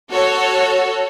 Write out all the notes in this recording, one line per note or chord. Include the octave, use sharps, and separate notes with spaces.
F#4 A4 C#5